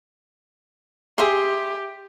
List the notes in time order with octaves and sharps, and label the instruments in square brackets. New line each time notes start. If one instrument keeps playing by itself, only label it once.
[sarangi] G4 [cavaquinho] G#4 E5 C6